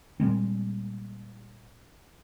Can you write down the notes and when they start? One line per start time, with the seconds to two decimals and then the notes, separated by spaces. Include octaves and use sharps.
0.20 A#2 G3 G#3 C4